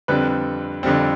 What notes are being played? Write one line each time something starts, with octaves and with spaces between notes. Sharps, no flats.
F2 D3 G3 C4 B4
F2 D3 G3 C4